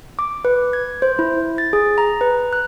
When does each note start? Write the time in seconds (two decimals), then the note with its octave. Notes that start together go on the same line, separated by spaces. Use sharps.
0.19 D6
0.45 B4
0.73 G#6
1.02 C5
1.19 E4
1.58 A6
1.73 G#4
1.98 A#5
2.21 B4
2.53 F#6